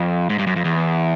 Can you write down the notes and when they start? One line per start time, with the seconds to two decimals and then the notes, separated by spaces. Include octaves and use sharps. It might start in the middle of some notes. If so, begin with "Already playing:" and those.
Already playing: F2
0.30 G#2
0.39 G2
0.47 F#2
0.56 F2
0.65 E2